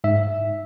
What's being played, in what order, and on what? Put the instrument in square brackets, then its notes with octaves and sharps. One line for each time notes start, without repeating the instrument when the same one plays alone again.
[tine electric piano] G#2 E5